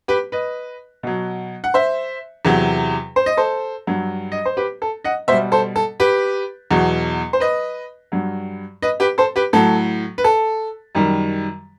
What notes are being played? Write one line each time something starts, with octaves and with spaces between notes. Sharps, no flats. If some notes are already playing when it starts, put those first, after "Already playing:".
G4 B4
B4 D#5
B2 F#3
F#5
C5 E5
E2 C3 F#3
C5
D#5
A4 C5
G2 F#3
D#5
C5
G4 B4
A4
D#5 F#5
B2 G3 C5 E5
A4 C5
A4
G4 B4
E2 B2 F#3
C5
B4 D#5
G2 F#3
B4 D#5
G4 B4
A4 C5
G4 B4
A2 F#3 A4
B4
A4
F#2 D#3 G3